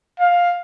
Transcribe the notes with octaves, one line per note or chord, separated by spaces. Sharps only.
F5